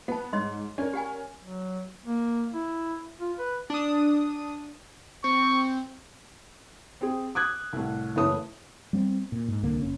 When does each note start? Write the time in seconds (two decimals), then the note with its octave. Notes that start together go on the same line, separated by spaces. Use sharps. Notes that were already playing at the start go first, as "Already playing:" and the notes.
0.08 B3 F#5 A5
0.33 G#2 C#5 D#5 C6
0.78 C#4 A#4 D5
0.93 G4 F#5 G#5
1.41 F#3
2.06 A#3
2.53 E4
3.21 F4
3.39 B4
3.70 D4 D#6
5.24 C4 C#6
7.01 C4 G#4
7.35 D6 D#6 F#6 G#6
7.73 C2 A2
8.16 F#1 E3 A3 C#5 D#6
8.93 G3 B3 C4
9.32 A#2
9.48 G#2
9.63 C2 D3 A#3
9.82 F#1 C#4